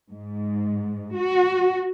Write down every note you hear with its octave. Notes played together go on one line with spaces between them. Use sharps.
G#2
F#4